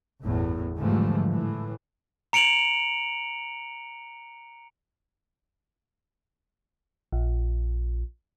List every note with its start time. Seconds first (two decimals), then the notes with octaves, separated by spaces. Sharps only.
0.22 G1 E2 A2
0.78 G#2 D3 E3 F3 G3 A3
1.28 A2 E3
2.33 A#5 C#7 D7 F7 F#7
7.12 A#1